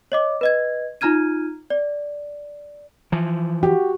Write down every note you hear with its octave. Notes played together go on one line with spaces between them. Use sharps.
C#5 D#5 D6
B4 D#5 G#6
D#4 F4 A#5 F6 G#6 D#7
D5
E3 F3
F#4 G4